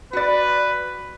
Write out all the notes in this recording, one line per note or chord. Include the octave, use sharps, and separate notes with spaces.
F#4 B4 D5